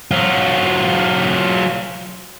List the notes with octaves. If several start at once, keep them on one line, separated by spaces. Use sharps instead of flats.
F#3 F4